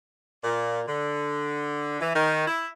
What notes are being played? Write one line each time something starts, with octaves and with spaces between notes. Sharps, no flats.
A#2
D3
E3
D#3
E4